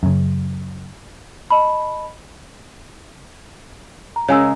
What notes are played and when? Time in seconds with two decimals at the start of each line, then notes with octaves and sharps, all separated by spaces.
0.03 F#2 C#3
1.50 D#5 A5 B5
4.16 A#5
4.28 C#3 G#3 A#4 C#5 G#5 E6